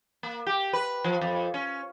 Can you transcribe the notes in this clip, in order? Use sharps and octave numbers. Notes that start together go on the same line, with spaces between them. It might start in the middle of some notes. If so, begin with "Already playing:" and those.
A#3
G4
B4
F3
F2
C#4